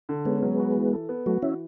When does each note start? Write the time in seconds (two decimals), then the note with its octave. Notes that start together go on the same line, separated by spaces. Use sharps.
0.09 D3
0.25 G#3 B3 C#4
0.43 F#3
0.60 F#4
0.76 E3
0.93 A4
1.09 B3
1.26 F#3 A3 F#4
1.42 E3 C#4 E4